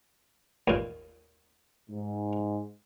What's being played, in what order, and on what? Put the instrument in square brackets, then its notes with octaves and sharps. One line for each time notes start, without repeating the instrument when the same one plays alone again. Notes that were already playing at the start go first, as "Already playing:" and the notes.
[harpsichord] D#2 A#2
[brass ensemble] G#2